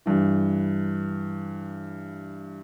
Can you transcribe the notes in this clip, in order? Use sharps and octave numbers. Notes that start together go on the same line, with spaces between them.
G2 E3